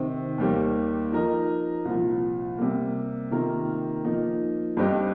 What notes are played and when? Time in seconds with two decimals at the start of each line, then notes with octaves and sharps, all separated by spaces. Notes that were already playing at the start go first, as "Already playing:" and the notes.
Already playing: C3 D#3 C4
0.38 D#2 D#3 G3 A#3 G4
1.12 F3 D#4 A#4 D#5
1.85 C2 A#2 F3
2.58 C3 G3 A#3
3.31 C3 D#3 A#3 F4 A#4
4.04 F3 A#3 D#4
4.77 G2 G3 C4 G4 D#5